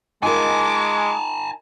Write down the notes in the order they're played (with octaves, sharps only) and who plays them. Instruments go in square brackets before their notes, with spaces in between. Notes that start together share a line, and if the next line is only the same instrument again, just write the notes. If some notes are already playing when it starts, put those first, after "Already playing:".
[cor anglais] G#3 [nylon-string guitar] D#4 F4 A#4 [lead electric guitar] G#5 A5 [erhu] D6